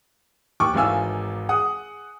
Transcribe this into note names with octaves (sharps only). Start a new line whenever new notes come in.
D#2 C#6 D6
G#1 G#2 E3 F5 G#5 E6
G#4 F#5 D#6